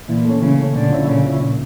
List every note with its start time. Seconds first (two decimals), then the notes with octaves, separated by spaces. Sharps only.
0.08 A#2 E3
0.25 A3 C#4
0.41 C#3 E3
0.58 A3 C#4
0.74 A#2 D3
0.90 F3 C#4 E4
1.07 A#2 C#3
1.24 F3 C#4 E4
1.40 A#2